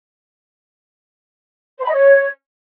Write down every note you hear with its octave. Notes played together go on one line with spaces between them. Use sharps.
C5
B5
D#5
C#5